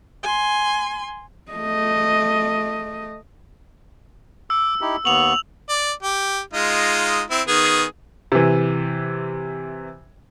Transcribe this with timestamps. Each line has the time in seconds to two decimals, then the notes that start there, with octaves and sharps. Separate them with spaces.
0.23 G#5 C6
1.52 A3 D#5
4.50 D6 E6
4.81 D#4 E4 G4
5.05 D#2 B3 C#6 F7 F#7
5.69 D5
6.03 G4
6.54 G#3 D#4 F4
7.31 C4 E4
7.48 D#3 B3 G#4
8.32 C3 E3